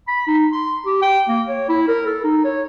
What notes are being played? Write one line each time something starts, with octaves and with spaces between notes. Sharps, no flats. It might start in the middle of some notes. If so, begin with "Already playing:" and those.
B5
D#4
C6
G4
G5
A#3
C#5
E4
A#4
A4
D#4
C#5